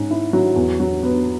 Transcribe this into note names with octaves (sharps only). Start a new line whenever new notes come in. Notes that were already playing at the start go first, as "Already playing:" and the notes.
Already playing: G#2 C#4
E4
F#3
E2
F#3
B3